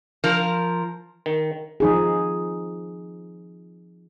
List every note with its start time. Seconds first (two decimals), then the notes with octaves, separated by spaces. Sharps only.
0.24 F3 A#4
1.26 D#3
1.80 F3 D#4 G#4